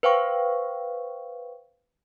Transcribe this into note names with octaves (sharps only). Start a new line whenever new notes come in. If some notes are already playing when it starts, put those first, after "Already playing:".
B4 C5 F5 G5 C#6